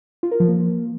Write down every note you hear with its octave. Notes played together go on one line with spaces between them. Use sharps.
F4
A#4
F3
A#3